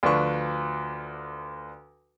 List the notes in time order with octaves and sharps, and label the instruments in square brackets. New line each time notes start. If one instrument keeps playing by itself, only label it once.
[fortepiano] D2 F3 D4 B4 C#6